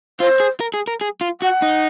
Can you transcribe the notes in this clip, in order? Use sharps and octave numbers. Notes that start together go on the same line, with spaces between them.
F4 C5
G#4
A#4
G#4
A#4
G#4
F4
F#4 F#5
D#4